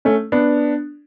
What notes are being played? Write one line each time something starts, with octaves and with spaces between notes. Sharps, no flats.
A3 C#4
B3 D4